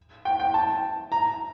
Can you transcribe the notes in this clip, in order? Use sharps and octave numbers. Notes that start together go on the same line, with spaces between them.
G5
G5
A5
A#5